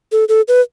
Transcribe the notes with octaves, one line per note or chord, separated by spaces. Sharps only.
A4
A4
B4